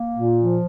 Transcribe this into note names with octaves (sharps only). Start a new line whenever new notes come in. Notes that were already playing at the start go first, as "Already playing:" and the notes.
Already playing: A#3
A#2
F3